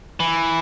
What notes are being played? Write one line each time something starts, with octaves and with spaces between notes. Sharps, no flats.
E3